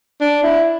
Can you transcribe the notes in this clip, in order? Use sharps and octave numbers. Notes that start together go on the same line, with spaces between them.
D4
E4